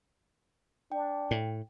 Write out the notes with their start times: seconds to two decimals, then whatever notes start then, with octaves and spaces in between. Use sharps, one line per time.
0.92 D4 G5
1.31 A2